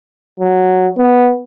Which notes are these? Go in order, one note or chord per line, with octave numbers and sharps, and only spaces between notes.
F#3
B3